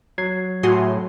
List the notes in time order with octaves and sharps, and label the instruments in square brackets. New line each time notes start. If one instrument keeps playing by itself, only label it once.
[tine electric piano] F#3 G#6 C7
[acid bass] A2 [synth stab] F#4 G#4 C6